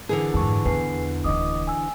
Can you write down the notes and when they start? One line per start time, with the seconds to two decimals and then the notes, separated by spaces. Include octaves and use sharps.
0.09 D3 E3 G#4 A#4
0.34 F2 G#2 A5 C#6
0.65 E2 B4 G#5 C7
1.24 D1 D4 D#5 D6 D#6
1.67 G#5 E6